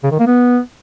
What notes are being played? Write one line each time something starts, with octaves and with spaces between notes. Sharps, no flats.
C#3
D#3
A#3
B3